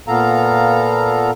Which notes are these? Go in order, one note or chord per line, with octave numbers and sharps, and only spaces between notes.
A#2 B3 A4 F5 A#5